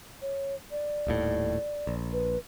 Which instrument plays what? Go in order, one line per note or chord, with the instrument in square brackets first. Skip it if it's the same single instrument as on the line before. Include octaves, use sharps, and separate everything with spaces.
[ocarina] C#5
D5
[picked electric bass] D#1 D#2 A2
A#1
[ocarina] B4